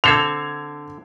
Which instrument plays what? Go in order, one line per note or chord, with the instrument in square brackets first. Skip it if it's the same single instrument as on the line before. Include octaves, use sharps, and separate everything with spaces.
[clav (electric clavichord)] D3 C4 A4 [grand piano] G#6 C7 F7